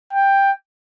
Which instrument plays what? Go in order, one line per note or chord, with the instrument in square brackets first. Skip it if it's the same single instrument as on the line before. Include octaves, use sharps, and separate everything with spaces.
[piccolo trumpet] G5